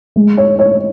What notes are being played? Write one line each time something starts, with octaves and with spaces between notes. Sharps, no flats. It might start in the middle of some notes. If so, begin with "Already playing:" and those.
G#3
C#5
C#5